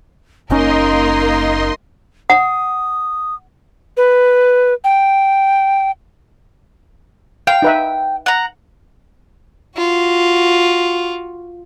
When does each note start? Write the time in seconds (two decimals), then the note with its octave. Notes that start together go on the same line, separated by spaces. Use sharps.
0.50 F#1 A#3 C#4 D#4 A#4 D#5 C6
2.30 F#5 D#6
3.97 B4
4.84 G5
7.47 F5 G5
7.62 D#4 B4 E5
8.26 F#5 A#5
9.77 F4 F#4